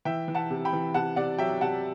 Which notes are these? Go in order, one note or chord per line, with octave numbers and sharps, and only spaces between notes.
E3 E5 G5
E3
F#5 A5
C3
G5 B5
E3
C3 F#5 A5
C3 D5 F#5
F#3 E5 G5
C3 F#5 A5